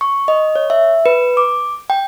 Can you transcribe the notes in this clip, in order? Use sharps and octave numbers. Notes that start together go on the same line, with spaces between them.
C#6
D#5
C#5
E5
B4
D6
G5